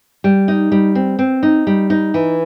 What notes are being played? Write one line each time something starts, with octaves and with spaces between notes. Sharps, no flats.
G3
D#4
G3
C4
C4
D#4
G3
D#4
E3